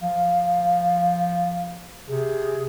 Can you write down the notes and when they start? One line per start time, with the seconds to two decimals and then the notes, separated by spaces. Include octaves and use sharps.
0.02 F3 F5
2.09 C3 G#4